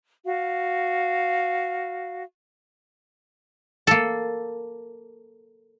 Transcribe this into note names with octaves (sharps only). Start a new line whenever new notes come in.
F#4 F5
A#3 A4